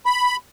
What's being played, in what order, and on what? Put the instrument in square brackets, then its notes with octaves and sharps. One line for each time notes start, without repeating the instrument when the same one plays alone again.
[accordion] B5